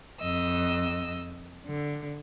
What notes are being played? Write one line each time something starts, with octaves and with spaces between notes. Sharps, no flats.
F2 D#5 E6
D3